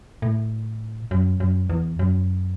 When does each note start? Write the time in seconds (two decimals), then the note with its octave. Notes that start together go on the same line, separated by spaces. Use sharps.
0.22 A2
1.11 F#2
1.40 F#2
1.70 E2
1.99 F#2